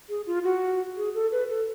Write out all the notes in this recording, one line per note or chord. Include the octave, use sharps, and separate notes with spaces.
G#4
F4
F#4
G#4
A4
B4
A4